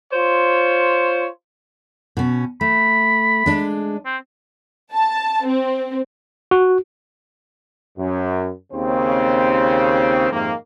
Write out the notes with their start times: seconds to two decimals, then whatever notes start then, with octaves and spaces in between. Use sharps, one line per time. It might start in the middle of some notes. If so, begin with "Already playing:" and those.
0.13 F4 C5 C#5
2.17 B2 C#4
2.61 A3 B5
3.46 G#3 D4
4.05 C4
4.92 A5
5.45 C4
6.51 F#4
7.98 F#2
8.72 D#2 C#3 C4
10.31 F2 G#2 C3 D#3 A#3